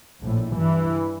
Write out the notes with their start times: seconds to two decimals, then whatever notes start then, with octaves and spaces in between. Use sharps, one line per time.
0.22 A#1 A2
0.55 G2 E3